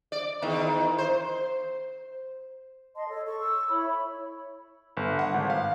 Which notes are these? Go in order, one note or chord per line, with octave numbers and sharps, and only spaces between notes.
D5
E2 D#3
C5
D#5 A5 C6
A4 C#5
A4 C#6
E6
E4 C#5 B5
G1
F#5
G#1
F5